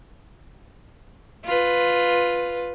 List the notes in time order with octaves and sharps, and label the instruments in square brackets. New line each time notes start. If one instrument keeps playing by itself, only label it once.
[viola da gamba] F4 B4